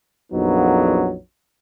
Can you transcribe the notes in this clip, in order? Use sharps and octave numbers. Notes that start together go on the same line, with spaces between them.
A#1 F2 F#3 B3 D#4